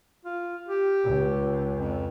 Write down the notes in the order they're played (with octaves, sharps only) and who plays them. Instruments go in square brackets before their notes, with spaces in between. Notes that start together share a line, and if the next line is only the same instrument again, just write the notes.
[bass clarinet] F4
G4
[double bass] C#2
[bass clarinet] F2